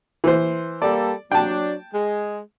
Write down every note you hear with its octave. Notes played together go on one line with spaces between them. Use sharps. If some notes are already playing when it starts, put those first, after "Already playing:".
E3 C5
G3 A#3 A4 D5
F#3 D4 G5 A5
G#3